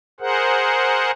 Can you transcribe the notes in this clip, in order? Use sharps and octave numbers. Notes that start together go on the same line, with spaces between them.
G#4 A#4 C5 F#5